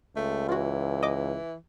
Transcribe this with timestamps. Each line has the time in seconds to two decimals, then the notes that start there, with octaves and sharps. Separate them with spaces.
0.16 C#2 A3
0.49 E3 F4 F#4
1.03 D#5 D6